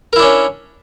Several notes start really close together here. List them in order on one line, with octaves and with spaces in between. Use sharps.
A#4 E4 D4 C#4